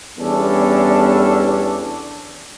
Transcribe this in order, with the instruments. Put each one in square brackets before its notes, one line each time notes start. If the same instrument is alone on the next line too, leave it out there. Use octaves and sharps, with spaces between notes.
[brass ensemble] E2 G3 B3 C#4 D4 A4